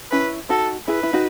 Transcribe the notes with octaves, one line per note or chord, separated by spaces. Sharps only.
C#4 E4 B4
D#4 F#4 A4
E4 G#4 B4
E4
D#4 F#4